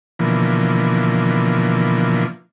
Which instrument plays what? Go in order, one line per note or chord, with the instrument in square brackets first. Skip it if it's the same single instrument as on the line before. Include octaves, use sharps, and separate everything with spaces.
[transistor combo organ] B2 D3 E3 F3 A#3